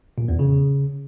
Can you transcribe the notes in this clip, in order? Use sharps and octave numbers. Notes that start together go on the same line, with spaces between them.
A#2
E2
C#3